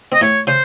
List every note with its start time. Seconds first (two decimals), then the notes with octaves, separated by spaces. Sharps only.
0.12 C4 D#5
0.21 A2 A3 C#5
0.47 C#3 C#4 C5